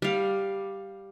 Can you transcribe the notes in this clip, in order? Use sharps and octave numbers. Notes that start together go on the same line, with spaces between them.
G3 F5